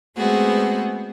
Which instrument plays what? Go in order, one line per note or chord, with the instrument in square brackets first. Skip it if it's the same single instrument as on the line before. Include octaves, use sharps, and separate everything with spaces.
[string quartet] G#3 A3 B3 C4 F#4 G#4